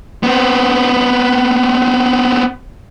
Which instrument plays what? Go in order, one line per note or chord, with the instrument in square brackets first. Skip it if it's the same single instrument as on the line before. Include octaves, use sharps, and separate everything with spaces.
[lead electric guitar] B3 C4